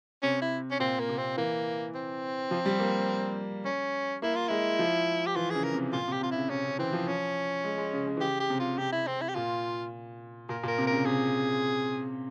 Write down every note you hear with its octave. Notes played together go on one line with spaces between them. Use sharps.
C3 C#4
E4
C#4
A#2 C4
A#3
C3
C4
E3 A#3
C4
F3
G3
A#3
C#4
A#3 E4
F4
G#3 E4
F3
G4
E3 F4
C#3 G#4
A#4
C3
A#2 F4
C3
G4
C3 F4
C#3 E4
C3 C#4
C#3
E3 C4
F3
C#4
G#3
G#3
C#3
C#3
E3
C#3 G4
G4
C3
F4
C3 G4
E4
C4
E4
G4
A#2 F4
A#2 A#4
A#2
A#4
C3
C#3 A#4
C3 G#4